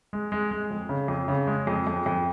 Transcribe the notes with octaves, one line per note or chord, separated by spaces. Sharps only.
G#3
G#3
G#3
F2
C#3
F2
C#3
G#3
F2
F2
F2